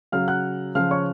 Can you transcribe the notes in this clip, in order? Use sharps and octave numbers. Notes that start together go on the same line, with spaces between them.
C#3 F#3 F5 F6
F#5 F#6
C#3 F3 F5 F6
C#5 C#6